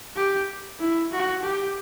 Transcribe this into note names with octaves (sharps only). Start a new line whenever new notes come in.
G4
E4
F#4
G4